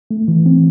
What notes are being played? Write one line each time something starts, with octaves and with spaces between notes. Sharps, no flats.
A3
E3
C4